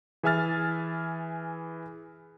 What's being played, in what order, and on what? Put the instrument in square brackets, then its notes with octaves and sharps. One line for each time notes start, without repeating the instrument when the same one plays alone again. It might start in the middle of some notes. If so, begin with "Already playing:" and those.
[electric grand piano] E3 G#4 E5 G#5 F6 A6